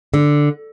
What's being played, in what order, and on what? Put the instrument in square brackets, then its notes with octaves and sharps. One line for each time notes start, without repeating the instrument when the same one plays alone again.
[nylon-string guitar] D3